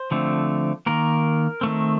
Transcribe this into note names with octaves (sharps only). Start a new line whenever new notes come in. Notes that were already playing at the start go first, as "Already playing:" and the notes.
Already playing: C5
D3 F3 A3 C4
D#3 A#3 A#4
D#3 A3 C4